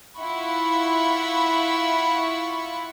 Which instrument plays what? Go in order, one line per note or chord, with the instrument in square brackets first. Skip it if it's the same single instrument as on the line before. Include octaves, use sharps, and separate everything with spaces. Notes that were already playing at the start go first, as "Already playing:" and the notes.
[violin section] E4 F4 F#5 B5 C#6